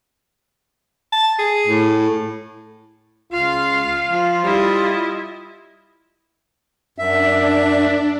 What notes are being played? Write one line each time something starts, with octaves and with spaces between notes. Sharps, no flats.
A5
G#4
A2
C#2 F4 F5
F3
G3 E4 D#5
F#2 D4 E5